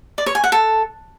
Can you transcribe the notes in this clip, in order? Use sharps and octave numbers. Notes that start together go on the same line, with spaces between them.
D5
C#5
G#5
F#5
A4